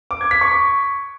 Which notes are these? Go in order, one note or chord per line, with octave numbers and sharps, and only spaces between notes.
D6
G#6
B6
C#6
C#6